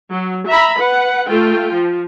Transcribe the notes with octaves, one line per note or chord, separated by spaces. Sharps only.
F#3
E5 A#5 B5
B4 F#5
A3 F4 G5
F3